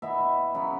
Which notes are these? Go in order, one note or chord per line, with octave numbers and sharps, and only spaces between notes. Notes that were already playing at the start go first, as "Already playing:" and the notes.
B2 B3 E4 E5
C#3 F#3 B3 E4